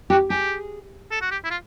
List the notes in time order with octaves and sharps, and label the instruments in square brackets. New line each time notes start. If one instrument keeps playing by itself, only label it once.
[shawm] F#4 [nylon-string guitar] G4
[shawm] G4 [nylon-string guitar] G#4
[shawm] A4
F#4
G4
E4
F4